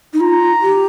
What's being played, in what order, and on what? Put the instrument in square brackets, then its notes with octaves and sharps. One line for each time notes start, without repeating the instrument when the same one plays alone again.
[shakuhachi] D#4
[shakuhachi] F4 [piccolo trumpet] A#5
[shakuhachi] G4